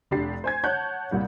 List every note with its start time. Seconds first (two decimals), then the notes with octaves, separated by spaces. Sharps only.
0.11 F1 D4 G4 A6 C7
0.44 C5 G#5 G#6
0.64 C#5 F#5 A5 F#6 G6
1.11 C2 A#2 G3 F#5